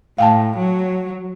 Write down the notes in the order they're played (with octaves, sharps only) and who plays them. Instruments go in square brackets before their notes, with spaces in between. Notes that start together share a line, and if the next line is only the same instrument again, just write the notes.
[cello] A2 [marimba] F5 G5 A5
[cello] F#3